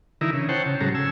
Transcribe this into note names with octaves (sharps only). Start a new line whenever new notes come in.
D3 E3 D#4 E4 A#4
C#3
C5 C#5 F#5 G5 A5
C#3
G#2 C#3 F#3 A4 A#5
C#3 G#5 E6